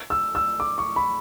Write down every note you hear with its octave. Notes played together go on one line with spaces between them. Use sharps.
E6
E6
D6
C#6
B5